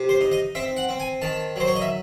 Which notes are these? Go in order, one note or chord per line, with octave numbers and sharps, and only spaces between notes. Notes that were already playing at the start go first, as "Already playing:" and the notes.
Already playing: C3
C5
D#4
D#5
C4 E5
F#5
C4
G#5
D#3 A5
F#3 C5
C#5
D#5
E5